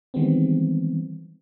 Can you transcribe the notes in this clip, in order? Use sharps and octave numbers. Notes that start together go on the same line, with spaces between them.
D#3 E3 G3 G#3 B3 C4